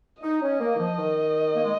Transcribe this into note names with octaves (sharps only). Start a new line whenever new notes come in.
D#4 D#5
C#4
A#3
D#3
F3
D#3
A#3
G#3